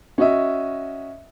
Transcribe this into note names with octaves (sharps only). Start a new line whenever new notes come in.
C#4 F#4 D#5 E5